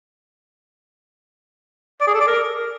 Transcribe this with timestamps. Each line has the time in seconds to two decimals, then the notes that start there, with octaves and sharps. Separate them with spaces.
2.01 D5
2.08 G#4
2.14 A4
2.21 D5
2.27 A#4